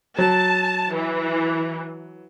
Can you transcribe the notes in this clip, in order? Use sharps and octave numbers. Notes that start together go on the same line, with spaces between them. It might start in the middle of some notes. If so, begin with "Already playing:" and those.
F#3 A5
E3